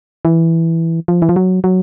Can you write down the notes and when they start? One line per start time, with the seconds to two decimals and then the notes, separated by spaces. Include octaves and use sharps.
0.25 E3
1.08 F3
1.22 E3
1.29 F3
1.36 F#3
1.64 F#3